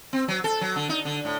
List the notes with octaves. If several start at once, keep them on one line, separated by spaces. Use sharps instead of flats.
C4
F#3
A4
F#3
D3
D#4
D3
A2